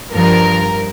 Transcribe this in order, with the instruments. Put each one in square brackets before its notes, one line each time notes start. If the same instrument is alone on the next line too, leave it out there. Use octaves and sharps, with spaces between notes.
[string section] G2 F3 A#4